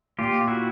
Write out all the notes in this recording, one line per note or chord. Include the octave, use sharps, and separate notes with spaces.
A#2 F4 G4
E4 F#4